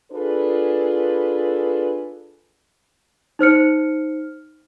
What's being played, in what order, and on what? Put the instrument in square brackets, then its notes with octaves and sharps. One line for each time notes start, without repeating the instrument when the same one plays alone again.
[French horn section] D4 F4 G#4 A4 B4
[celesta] D#4 C5 F6 C#7